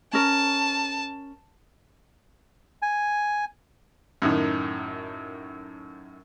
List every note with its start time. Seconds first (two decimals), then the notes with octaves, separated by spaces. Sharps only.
0.13 C#4 A#4 A5
2.82 G#5
4.22 F#2 A2 D#3